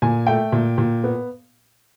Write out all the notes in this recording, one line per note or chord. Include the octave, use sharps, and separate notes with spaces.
A#2 G#5
A3 G5
A#2
A#2
B3